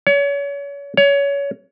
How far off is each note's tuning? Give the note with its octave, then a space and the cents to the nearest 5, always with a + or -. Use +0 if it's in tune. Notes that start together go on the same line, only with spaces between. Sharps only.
C#5 +35
C#5 +25